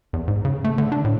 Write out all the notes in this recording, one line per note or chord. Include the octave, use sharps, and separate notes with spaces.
E2
G#2
C#3
A3
D3
D4
A2